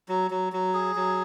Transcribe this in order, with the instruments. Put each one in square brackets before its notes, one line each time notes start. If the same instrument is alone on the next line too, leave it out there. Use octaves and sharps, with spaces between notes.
[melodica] F#3
F#3
F#3
G#4
F#3